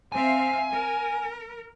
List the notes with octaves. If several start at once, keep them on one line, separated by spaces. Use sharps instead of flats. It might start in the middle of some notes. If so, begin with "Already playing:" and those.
C4 E5 F5 G#5
A#4